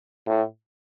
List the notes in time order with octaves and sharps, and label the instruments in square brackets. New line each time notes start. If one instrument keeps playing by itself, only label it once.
[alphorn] A2